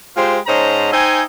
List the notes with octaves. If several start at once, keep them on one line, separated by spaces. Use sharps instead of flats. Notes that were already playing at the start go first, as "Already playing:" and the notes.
G#3 F4 G4 C5
G#2 C#4 C5 D#5 A5 A#5
D#4 C5 E5 G5 G#5